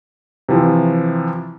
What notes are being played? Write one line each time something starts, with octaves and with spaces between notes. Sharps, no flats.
C3 E3 F3